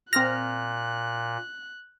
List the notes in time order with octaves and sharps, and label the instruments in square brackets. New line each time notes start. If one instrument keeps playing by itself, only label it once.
[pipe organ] A#2 [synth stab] C4 F6 [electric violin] F#6 [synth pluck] A#6